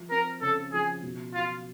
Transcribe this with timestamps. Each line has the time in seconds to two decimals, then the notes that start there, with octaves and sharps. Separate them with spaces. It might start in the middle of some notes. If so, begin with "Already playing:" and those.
Already playing: F3
0.11 C4 A#4
0.42 C#3 A4
0.72 F3 G#4
1.03 B2
1.34 F#3 F4